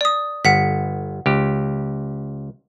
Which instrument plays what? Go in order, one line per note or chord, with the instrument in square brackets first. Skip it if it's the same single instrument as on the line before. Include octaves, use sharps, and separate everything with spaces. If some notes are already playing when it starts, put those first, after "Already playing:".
[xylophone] D5 D#6
[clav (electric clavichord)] G1 [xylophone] F#5 B6
[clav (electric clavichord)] C#2 G4